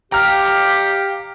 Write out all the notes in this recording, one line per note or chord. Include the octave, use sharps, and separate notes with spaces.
G4 F5 G5 A#5 F6